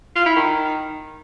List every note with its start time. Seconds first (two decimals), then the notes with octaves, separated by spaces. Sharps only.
0.15 F4
0.26 E4
0.36 D#3